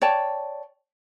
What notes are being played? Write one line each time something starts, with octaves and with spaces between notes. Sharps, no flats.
C#5 D5 G5 A5